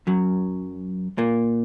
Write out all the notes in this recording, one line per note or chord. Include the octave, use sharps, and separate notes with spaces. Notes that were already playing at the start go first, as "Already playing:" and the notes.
F#2 F#3
A#2 A#3